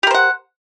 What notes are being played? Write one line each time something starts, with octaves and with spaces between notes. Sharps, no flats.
G4 A#4 C5 F#5